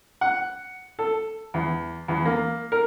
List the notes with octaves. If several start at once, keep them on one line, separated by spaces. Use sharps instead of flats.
F#5
A4
E2
E2
A#3
A#4